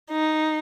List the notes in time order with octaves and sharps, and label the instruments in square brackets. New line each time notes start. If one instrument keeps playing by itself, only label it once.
[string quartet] D#4